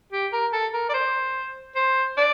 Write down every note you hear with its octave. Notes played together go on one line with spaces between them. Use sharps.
G4
A#4
A4
A#4
D5
C5
C5
D5